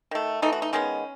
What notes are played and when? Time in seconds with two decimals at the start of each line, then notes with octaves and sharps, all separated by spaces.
0.11 D#3 A3
0.42 E3 A3 D#4
0.52 F#4
0.62 D#4
0.73 D#3 G#3 B3 C#4